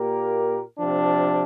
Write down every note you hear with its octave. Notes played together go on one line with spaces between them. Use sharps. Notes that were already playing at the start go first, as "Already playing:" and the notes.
Already playing: A#2 A#3 G4 A#4
C3 F3 D4